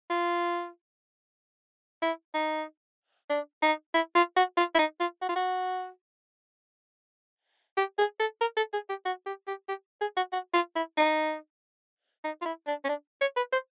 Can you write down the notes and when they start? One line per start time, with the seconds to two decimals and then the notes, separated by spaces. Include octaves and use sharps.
0.10 F4
2.02 E4
2.34 D#4
3.30 D4
3.62 D#4
3.94 E4
4.15 F4
4.36 F#4
4.57 F4
4.75 E4
4.79 D#4
5.00 F4
5.21 F#4
5.29 F4
5.36 F#4
7.77 G4
7.98 G#4
8.19 A4
8.41 A#4
8.57 A4
8.73 G#4
8.89 G4
9.05 F#4
9.26 G4
9.47 G4
9.69 G4
10.01 G#4
10.16 F#4
10.32 F#4
10.54 F4
10.76 E4
10.97 D#4
12.24 D#4
12.41 F4
12.45 E4
12.67 D4
12.84 C#4
12.89 D4
13.21 C#5
13.36 B4
13.52 C5